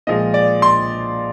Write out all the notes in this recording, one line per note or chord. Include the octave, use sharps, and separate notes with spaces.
A#2 F3 G#3 D#5
D5
C6